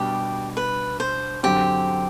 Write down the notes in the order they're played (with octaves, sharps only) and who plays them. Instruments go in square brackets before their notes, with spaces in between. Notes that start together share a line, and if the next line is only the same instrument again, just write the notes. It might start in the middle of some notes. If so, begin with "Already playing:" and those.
Already playing: [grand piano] B2 G3 D4 [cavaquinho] G4
[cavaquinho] B4
C5
[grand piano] F#2 D3 F#3 C4 [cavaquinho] G4